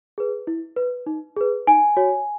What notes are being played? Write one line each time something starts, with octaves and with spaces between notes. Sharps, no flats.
G#4 B4
E4
B4
D#4
G#4 B4
D#4 G#5
F#4 C#5